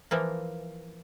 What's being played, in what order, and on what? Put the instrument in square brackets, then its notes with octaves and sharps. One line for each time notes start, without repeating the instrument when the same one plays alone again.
[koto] E3 F3 A#3